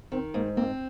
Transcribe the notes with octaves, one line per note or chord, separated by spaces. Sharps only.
D#3 C4
G#2 A#3
A#3 C4